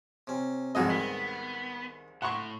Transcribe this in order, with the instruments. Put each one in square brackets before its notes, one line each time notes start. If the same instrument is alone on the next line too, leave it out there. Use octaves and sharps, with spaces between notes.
[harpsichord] C3 C#4
[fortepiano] C2 G#2 D#5 [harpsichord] F2 F#4 C#5
[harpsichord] D#3 [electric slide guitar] B3
[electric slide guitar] A2 [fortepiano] F#5 C6 C#6